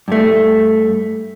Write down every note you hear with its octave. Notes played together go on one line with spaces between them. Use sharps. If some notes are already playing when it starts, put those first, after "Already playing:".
G2 A3